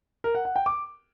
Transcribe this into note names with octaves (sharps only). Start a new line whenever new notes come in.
A#4
F#5
F#5
G5
D6